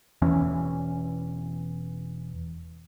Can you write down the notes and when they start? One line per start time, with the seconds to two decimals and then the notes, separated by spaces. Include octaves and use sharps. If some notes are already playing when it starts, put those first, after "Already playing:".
0.22 E1 E2 E3 C#4